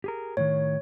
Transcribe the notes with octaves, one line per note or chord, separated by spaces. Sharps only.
G4 G#4 A#4
A2 C3 D#3 C#5